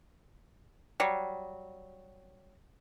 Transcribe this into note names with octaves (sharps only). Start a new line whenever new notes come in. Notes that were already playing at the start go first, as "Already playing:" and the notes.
F#3 G3